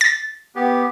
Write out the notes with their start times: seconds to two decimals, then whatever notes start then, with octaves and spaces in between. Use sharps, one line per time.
0.01 A6
0.56 B3 G4